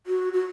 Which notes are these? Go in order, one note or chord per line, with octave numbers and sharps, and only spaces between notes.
F#4
F#4